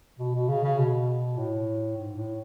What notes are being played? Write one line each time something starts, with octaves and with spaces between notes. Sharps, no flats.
B2
B2
C#3
C#3
B2
A2
G#2
A2